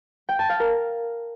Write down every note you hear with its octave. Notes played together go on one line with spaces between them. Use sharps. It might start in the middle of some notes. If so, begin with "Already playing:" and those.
G5
A5
F5
A#4